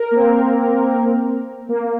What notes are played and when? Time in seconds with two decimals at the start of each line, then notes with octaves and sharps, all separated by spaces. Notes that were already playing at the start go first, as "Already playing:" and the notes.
Already playing: A#4
0.11 A#3
0.16 C4
1.69 A#3